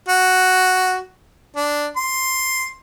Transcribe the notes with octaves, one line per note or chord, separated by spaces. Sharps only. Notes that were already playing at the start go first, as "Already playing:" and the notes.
F#4
D4
C6